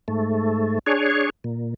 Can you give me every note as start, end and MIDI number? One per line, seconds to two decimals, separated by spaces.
0.08 0.79 44
0.08 0.79 57
0.86 1.30 62
0.86 1.30 68
0.86 1.30 73
1.44 1.74 46